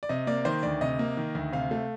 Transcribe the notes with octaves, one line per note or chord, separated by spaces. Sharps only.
D5
C3 D#5
A#3 D5
D#3 C5
D2 D5
C3 D#5
A#3
D#3
D2
C3 F5
A3